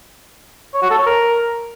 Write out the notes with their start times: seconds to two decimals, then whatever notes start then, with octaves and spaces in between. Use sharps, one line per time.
0.74 C#5
0.82 F#4
0.90 A4
0.98 C#5
1.06 A#4